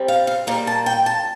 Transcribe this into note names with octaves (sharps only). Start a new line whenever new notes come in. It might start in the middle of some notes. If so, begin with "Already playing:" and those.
Already playing: C3 G3 C4
F5
F5
A#2 G3 A#3
A5
G5
A5